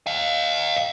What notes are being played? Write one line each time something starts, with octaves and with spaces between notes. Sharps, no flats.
D#5 F5